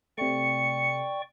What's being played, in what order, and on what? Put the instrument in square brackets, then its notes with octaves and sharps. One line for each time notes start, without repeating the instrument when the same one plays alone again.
[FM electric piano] C3 A3 [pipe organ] D5 G5 C#6 [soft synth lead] C#7